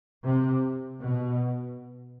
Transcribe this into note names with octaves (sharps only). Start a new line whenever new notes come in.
C3
B2